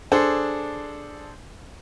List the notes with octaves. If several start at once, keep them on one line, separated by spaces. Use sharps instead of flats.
D4 G#4 A4 C5